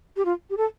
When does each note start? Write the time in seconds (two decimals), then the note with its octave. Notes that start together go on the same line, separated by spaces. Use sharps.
0.17 G4
0.25 F4
0.50 G4
0.57 A4